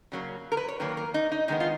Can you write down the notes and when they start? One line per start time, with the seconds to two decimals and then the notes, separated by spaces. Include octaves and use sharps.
0.12 C#3 F#3 A#3
0.52 A#4
0.57 B4
0.68 C#5
0.80 D#3 F#3 A#3 B4
0.97 A#4
1.14 D#4
1.32 D#4
1.48 D#3 G#3 B3 D#4
1.60 F4